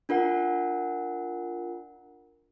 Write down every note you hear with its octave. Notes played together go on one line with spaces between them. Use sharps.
D4 F4 A#4 F#5